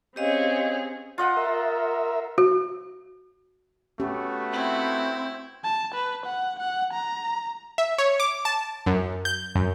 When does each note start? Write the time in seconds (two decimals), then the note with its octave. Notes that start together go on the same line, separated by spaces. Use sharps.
0.16 C4 C#4 G4 G#4 D#5 F5
1.18 F4 D#5 F#5
1.37 A#4 E5
2.38 F#4
4.00 A3 B3 C#4 F#4 G4
4.52 C4 E4
5.64 A5
5.94 B4
6.26 F#5
6.59 F#5
6.93 A#5
7.78 E5
7.98 C#5
8.20 D6
8.45 A5
8.86 F#2
9.25 G6
9.56 F#2